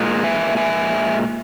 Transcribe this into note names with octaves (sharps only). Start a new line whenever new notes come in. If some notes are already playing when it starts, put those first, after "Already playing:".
Already playing: A#2 G#3
E5 G#5
E5 G#5